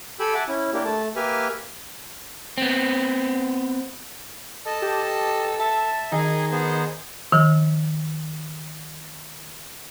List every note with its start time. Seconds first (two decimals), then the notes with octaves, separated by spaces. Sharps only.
0.20 G4 A4 G5 G#5 B5 E6
0.34 E5 F#5 G#5 A5 D6
0.48 C#4 E4
0.73 A#3 D4 E4 G4
0.85 A3 A5
1.16 A#3 G4 B4 E5 G#5 F6
2.58 B3 C4
4.66 A4 D#5 A5
4.82 G4
5.59 E5 A5
6.12 D#3 D#4 G#4 G#5
6.51 B3 G#4 C5
7.32 D#3 F3